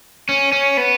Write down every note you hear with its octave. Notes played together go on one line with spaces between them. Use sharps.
C#4
C#4
B3